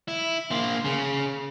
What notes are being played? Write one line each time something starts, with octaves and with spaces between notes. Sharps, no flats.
E4
A#3 C5
C#3